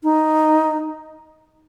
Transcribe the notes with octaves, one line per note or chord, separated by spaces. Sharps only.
D#4